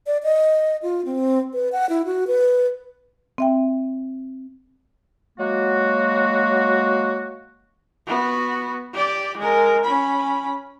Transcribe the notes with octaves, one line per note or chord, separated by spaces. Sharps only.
D5
D#5
F4
C4
B4
F#5
E4
F#4
B4
C4 E5 G5
F#3 G#3 A#3 F#4
B3 F#4
G4 D5
G#3 A#4
C#4 B5